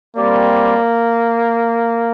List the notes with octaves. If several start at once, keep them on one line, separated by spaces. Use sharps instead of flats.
G3 A#3 C4 G4 D5